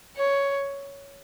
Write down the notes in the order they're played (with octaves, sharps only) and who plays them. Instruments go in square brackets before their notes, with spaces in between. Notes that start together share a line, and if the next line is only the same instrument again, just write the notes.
[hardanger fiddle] C#5